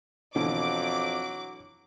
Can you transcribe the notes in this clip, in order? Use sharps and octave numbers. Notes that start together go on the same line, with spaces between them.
F2 B2 D3 E3 F#3 D6